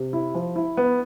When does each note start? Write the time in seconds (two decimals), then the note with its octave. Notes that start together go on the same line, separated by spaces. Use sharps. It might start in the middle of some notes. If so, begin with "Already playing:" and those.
Already playing: C3
0.13 E4
0.35 F3
0.56 E4
0.77 B3